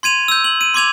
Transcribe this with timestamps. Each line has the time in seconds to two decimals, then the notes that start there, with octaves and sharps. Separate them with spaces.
0.03 C6 G#6 D#7 F7
0.28 E6 G6
0.44 F#7
0.61 D#7
0.74 C6 D6 G#6 F7